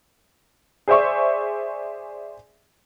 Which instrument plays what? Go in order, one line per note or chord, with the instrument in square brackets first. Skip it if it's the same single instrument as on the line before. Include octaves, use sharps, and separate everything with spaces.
[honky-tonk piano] G#4 C5 D5 E5 C#6